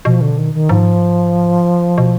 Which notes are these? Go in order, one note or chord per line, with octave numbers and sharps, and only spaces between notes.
B2 F3
D3
D#3
D#3
G#2 F3
B2